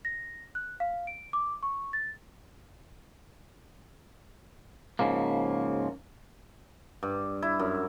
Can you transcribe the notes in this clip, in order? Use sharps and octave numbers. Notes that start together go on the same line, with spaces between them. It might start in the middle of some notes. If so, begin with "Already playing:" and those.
A#6
F#6
F5
D7
D6
C#6
A6
G#2 C#3 F3 A#3
G2
E4
F#2